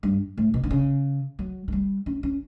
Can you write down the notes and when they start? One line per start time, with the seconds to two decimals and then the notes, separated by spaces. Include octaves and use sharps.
0.03 G2
0.37 A2
0.54 B2
0.64 D3
0.71 C#3
1.39 F#3
1.68 A3
1.72 G3
2.06 C#4
2.23 C#4